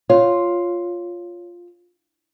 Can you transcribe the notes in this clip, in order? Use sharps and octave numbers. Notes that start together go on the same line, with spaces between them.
F4 C#5